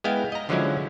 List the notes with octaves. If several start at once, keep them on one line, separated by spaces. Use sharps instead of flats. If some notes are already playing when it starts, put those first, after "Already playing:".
G#3 B3 E4 F5 G5
D#5 A#5
D3 F3 F#3 G#3 C#4 E4